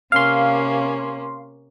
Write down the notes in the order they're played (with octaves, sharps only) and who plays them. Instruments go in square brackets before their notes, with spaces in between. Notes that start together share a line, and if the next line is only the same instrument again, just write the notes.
[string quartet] C3 A#3 C#4 [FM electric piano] F5 C6